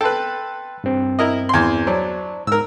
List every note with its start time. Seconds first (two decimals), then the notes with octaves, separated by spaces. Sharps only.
0.01 A4 B4 G5 C6
0.84 G2 C4
1.19 E4 A#4 D#5
1.49 E2 C6
1.87 F#3 C5 D5 A5
2.47 G#2 A#4 E6